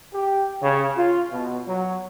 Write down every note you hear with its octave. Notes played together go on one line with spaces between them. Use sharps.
G4
C#3
F4
B2
F#3